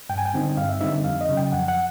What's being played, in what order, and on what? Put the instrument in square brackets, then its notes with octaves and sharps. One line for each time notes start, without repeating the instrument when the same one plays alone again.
[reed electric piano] G2 G5
G#5
G5
D3 G3 C4 D#4
G2 F5
E5
D3 G3 C4 D#4 E5
F2 F5
D#5
C#3 F#3
G5
F2 F#5
F#5